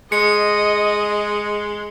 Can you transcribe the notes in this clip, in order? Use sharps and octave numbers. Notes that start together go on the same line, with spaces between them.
G#3 D#5 C#7